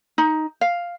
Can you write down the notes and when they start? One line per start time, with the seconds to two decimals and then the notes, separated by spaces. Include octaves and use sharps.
0.18 D#4
0.61 F5